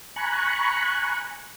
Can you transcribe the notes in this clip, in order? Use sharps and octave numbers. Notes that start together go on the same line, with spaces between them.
G#5 A#5 B5 C#6 F#6